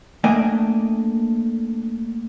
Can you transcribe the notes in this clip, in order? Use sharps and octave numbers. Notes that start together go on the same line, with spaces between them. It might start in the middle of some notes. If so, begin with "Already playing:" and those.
A3 A#3 D4 D#5 G5 G#5